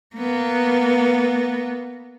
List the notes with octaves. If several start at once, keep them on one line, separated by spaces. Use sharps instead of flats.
A#3 B3